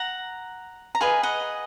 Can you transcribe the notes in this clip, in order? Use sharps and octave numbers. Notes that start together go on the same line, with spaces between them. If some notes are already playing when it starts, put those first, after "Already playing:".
Already playing: F#5 A#5
A#5
G#4 B4 D#5 F5 G#5
D#5 F#5